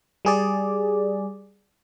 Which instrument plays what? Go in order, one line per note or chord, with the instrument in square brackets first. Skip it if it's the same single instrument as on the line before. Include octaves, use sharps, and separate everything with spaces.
[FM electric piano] G3 G#4 D5